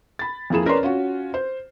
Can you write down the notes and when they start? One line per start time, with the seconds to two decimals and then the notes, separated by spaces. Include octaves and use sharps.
0.19 B5 A6
0.50 F2 A#3 E4 G#4 E7
0.66 C#4 A#4 B4 C#5 D5 C6
0.83 C#4 F4 F#4
1.34 C5